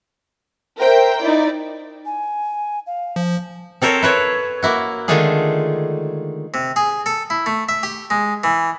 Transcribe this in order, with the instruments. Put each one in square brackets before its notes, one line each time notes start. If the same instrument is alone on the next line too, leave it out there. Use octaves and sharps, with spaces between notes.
[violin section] A#4 C5 E5 G5
D#4 E4 D5
[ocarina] G#5
F5
[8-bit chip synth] F3
[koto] C4 A4 A#4 C5 C#5
E4 B4 C#5
A#3 E4 F#4
D3 D#3 G#3 A3 F4 G#4
[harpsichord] C3
G#4
A4
E4
A3
E5
G4
G#3
E3